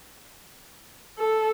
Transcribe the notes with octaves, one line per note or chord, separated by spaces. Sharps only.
A4